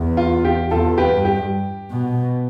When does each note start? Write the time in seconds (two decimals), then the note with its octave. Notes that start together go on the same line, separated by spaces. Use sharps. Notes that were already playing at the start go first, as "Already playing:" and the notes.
Already playing: E2
0.17 F4
0.45 G4
0.71 E2 F4 A4
0.98 G4 B4
1.11 G2
1.25 G4
1.91 B2